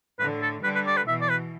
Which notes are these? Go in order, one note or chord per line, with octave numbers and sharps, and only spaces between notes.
A2 D3 B4
A4
D3 G3 B4
B4
D5
B4
B2 E3 E5
D5
B4